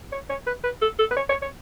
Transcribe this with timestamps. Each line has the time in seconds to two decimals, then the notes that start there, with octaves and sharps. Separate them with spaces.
0.12 C#5
0.29 C#5
0.47 B4
0.64 B4
0.82 A4
0.99 A4
1.11 B4
1.16 C#5
1.29 C#5
1.42 C#5